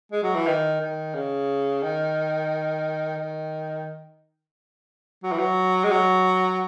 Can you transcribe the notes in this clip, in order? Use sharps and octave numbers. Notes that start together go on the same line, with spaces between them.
G#3
F#3
E3
D#3
D#3
C#3
D#3
D#3
F#3
E3
F#3
G#3
F#3